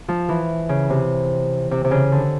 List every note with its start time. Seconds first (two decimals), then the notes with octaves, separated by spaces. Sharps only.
0.08 F3
0.29 E3
0.69 C#3
0.90 C3
1.71 C3
1.84 C3
1.91 C#3
2.12 D3